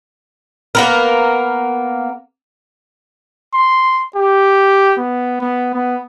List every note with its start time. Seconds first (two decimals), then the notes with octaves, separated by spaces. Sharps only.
0.75 A#3 B3 A#4
3.54 C6
4.16 G4
4.98 B3
5.41 B3
5.74 B3